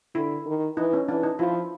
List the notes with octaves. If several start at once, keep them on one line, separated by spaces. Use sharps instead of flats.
D3 E4
D#3
E3 D#4
C#4
E3 D4
D#4
F3 E4